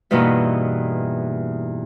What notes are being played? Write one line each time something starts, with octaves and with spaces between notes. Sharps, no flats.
E2 G2 B2 A#3 D#4 E4